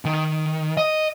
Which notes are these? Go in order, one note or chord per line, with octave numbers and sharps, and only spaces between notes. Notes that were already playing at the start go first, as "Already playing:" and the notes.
D#3
D#5